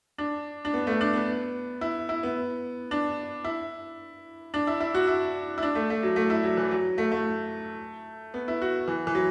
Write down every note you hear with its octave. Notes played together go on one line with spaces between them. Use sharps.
D4
D4
B3
A3
D4
B3
E4
E4
B3
D4
E4
D4
E4
E4
F#4
E4
E4
D4
A3
A3
F#3
A3
E4
F#3
E3
F#3
A3
A3
B3
E4
F#4
E3
E3
F#3